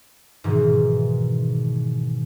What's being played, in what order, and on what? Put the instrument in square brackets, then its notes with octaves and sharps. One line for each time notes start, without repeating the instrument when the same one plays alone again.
[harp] G#2 B2 D#3 E3